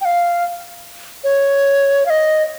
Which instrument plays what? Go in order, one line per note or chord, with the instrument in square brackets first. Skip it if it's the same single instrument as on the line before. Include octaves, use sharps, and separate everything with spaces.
[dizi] G5
F5
C#5
F5
D#5